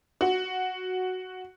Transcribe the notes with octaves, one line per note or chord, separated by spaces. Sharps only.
F#4